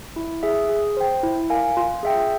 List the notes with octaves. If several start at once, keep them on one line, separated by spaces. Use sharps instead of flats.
E4
G#4 E5
G#4
C5 G5
E4
A#4 F5 G#5
F4
G#4 E5 G5